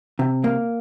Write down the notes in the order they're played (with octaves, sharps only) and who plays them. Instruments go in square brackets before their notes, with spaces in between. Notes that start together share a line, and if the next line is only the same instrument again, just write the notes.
[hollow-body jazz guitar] C3
A#3